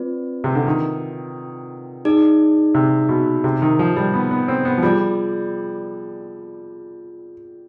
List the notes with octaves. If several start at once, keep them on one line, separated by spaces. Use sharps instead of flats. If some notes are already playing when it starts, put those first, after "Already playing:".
Already playing: C4 F4 B4 D5
C3
D3
D#3
D#4 G#4 D5
C3
B2
C3
D#3
F3
G3
B3
B3
C4
B3
F3
G3 F4 G#4 D5